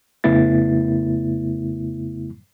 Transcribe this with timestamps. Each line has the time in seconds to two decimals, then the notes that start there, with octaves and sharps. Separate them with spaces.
0.24 F2 C#3 A3 B3 E4 A6